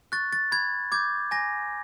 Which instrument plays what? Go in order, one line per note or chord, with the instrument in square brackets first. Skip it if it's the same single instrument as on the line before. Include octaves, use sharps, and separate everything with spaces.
[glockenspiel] C#6 F#6 A6
A6
B5 G#6
D6 G6 G#6
G#5 A#6